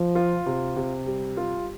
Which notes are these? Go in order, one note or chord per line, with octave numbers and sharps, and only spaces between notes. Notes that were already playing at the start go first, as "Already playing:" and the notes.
Already playing: F3
F4
C3
C3
G3
F4